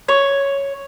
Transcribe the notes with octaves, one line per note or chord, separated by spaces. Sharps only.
C#5